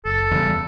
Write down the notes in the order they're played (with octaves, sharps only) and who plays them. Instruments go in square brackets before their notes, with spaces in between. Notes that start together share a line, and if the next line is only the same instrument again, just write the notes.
[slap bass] F#1 [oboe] A4
[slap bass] E2 C#3 G3